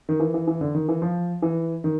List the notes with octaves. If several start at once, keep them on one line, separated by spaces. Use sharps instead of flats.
D#3
E3
E3
E3
D3
D#3
E3
F3
E3
D#3